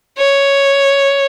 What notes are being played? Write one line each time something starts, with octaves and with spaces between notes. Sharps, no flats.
C#5